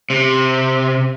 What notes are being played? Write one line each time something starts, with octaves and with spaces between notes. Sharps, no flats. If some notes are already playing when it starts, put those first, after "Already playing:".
C3